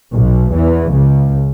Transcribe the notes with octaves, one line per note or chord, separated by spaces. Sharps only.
B1 B2
E2 E3
C#2 C#3